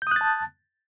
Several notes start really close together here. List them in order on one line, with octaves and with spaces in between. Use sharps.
G6 D#6 F#6 A6 A5